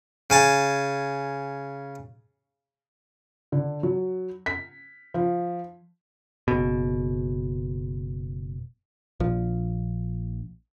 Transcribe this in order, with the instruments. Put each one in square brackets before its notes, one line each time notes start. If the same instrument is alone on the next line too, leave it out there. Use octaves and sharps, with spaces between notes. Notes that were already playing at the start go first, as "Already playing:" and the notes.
[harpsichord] C#3 G#5 A5
[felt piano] D3
F#3
B6
F3
[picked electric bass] F#1 B2
A#1 F3